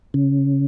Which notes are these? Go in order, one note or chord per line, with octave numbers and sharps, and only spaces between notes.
C#3